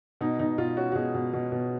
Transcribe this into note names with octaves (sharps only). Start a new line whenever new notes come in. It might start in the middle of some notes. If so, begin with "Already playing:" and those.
B2 D#4
B2 D#4
B2 F4
C#4 F#4
F#4
B2 G#4
B2
B2
B2